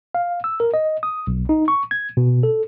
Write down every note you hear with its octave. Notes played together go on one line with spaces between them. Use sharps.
F5
E6
A#4
D#5
D#6
B1
D#4
C#6
G#6
B2
A4